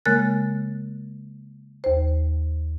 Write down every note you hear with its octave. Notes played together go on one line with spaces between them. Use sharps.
C#3 G#3 A#3 A#4 F#6 A6
D#2 C5